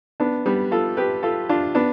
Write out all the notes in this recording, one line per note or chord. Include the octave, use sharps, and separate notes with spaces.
B3 D4
G3 B3
F4 A4
G4 B4
F4 A4
D4 F4
B3 D4